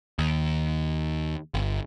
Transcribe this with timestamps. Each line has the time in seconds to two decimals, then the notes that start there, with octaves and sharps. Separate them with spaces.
0.19 D#2
1.54 G1